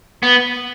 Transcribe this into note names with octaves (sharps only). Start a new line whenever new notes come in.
B3